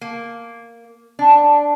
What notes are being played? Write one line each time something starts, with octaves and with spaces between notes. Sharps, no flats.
A#3
D4